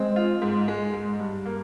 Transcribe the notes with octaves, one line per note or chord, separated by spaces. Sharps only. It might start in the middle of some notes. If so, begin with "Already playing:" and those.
Already playing: G#3 C4
F4
G#2
G#3
G#2
G2
A#3